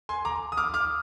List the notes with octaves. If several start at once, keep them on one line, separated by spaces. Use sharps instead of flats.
G#5 C6
A#5 D6
D#6
D6 F6
D6 F6